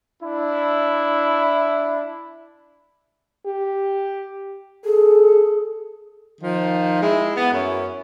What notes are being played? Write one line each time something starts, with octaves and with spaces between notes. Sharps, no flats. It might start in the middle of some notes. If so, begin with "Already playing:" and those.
D4 E4
G4
G#4 A4
D#3 F3
G#3 E4
B3
F#2 C#4 E4